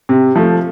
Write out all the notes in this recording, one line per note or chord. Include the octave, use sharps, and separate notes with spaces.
C3
F3 A3